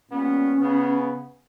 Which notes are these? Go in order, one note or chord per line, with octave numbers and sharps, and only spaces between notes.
A#2 G3 B3 C#4
C#3 B3